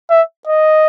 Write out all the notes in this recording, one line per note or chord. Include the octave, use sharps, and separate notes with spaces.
E5
D#5